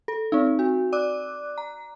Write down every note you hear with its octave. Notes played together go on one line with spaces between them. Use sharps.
A4
C4 D#4
F#4
D5 D6 F#6
A#5